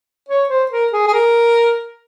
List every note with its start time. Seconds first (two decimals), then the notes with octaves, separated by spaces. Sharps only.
0.29 C#5
0.49 C5
0.71 A#4
0.92 G#4
1.07 G#4
1.14 A#4